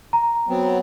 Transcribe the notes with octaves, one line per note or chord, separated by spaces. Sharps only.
A#5
F#3 B3 C4